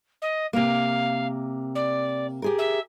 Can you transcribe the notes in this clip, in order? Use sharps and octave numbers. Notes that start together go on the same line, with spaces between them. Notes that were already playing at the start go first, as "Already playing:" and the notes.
D#5
C3 A#3 F5
D5
G4 G#4 A#4
E5